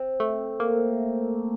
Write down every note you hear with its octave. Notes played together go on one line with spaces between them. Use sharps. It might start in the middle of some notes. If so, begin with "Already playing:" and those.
Already playing: C4
A3
A#3